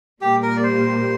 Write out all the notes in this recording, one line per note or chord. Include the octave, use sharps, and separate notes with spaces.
A#2 G3 A#3 G4
A#4
D5
C5